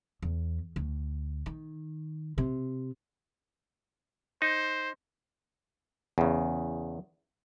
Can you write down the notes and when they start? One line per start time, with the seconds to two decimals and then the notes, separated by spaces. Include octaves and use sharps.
0.22 E2
0.76 D2
1.46 D#3
2.38 C3
4.42 D#4 C5
6.18 E2 C#3